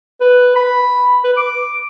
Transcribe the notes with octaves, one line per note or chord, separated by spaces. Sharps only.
B4
B5
B4
D6